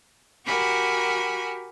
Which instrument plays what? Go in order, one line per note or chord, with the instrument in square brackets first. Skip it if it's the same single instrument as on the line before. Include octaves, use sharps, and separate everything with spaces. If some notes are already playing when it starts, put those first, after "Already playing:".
[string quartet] F#4 G4 A#4 G#5 B5